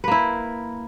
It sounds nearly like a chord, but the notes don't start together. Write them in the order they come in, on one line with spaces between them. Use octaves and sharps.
B4 A#3 E4